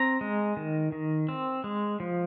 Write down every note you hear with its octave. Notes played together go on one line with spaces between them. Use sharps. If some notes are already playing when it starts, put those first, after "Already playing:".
Already playing: C4 A#5
G#3
D#3
D#3
C4
G#3
F3